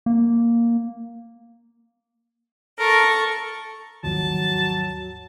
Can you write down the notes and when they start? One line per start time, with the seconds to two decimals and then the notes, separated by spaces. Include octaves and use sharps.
0.06 A#3
2.79 A4 A#4 C#6
4.04 G#1 D#2 F3 F#3 A5